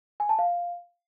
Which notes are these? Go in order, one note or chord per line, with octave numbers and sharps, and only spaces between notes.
G#5
A5
F5